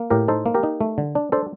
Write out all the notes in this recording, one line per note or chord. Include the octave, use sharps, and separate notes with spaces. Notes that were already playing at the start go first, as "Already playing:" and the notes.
Already playing: A#3
A2 G4 A#4
D#4 A4 C5
A#3
G4 A#4
D#4
A3
D3
D4
D4 A4 C5